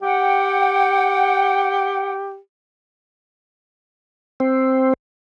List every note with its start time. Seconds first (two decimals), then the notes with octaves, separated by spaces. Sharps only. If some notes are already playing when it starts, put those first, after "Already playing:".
0.02 G4 F#5 G5
4.40 C4